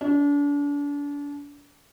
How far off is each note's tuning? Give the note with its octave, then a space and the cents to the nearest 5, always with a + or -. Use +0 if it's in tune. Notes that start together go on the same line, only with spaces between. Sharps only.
D4 -35